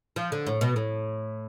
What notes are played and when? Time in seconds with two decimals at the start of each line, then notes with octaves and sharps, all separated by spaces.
0.16 F3
0.32 D3
0.46 A2
0.61 B2
0.76 A2